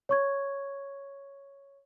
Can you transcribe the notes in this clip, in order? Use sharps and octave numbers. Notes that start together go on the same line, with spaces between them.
C#5 C#6 G#6